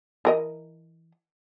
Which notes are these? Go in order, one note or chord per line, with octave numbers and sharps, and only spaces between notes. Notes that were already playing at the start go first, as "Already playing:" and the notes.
E3 A#4 D#5